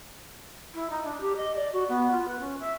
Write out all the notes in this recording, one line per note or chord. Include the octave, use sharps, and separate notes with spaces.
E4
D#4
D4
G4
D#5
D5
F#4
B3
F4
B4
C#4
E5